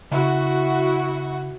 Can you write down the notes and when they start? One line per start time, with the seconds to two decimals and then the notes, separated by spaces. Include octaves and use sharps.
0.11 C#3 E4 F#4